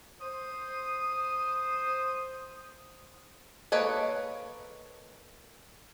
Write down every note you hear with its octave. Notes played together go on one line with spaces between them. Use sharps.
C5 D#6
A#3 A4 B4 C#5 D#5